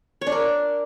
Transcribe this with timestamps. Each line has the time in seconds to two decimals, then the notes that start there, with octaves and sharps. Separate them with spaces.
0.21 C#5
0.27 D4
0.32 A#4